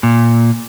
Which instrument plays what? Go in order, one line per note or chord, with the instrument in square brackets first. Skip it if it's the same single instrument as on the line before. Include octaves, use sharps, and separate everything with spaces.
[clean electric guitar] A#2